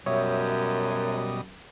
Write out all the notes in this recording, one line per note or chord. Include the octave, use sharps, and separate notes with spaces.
F#2 B2 G3 C#5 D#5 E5